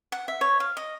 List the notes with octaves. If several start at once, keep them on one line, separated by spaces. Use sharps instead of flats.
F#5
E5
C#5
F5
D#5